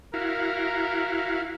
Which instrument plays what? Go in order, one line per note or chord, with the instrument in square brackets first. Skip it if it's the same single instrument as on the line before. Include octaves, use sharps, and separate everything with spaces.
[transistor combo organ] E4 F#4 F5 [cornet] A#4